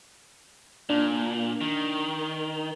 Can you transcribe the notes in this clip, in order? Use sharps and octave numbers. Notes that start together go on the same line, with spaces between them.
A#2 D4
D#3